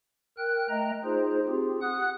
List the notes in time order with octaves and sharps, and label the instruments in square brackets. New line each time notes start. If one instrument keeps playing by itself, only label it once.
[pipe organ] A#4 G5 F#6
A3 D#5 G5 A#5
D#4 F4 G#4 C5
C4 F4 G4 G#4
F#5 D#6 F#6